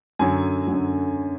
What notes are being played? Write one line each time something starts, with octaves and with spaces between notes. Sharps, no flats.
F#2 D3 F#3 G#5
F#2 D3 F#3